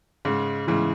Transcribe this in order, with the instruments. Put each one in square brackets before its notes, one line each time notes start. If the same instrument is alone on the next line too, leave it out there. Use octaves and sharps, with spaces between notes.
[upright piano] G#2 C#3 [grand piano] G#3
[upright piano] G#2 C#3 [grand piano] E3